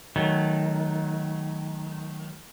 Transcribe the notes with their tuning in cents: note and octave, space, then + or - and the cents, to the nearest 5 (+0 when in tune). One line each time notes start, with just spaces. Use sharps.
D#3 +10 F#3 +0 A3 -15